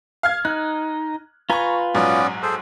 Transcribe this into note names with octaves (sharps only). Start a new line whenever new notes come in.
F5 F6 G#6
D#4 F#6
F4 B4 G#5 A#5 C#6
A#1 G#2 F#3 B3 C#4 D5
G#4 A4 C5